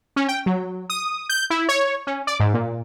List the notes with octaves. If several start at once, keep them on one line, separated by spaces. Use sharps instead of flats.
C#4
G5
F#3
D#6
G6
E4
C#5
C#4
D5
G#2
A#2